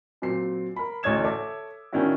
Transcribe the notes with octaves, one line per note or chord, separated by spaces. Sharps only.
A#2 F#3 C4 C7
A#4 B5
A1 D2 C#5 D#6 G#6 E7
A4 C#5 E5 D6 E6
D#3 C#4 D4 E4 F#4